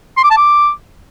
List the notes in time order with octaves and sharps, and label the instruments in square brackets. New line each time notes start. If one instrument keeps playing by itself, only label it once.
[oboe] C6
D6
A5
D6